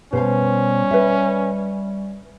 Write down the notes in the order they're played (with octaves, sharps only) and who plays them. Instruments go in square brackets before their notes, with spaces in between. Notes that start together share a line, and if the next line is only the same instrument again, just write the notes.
[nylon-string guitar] B2 C5 F5 [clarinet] G3 [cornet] C#4
[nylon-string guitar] B4 E5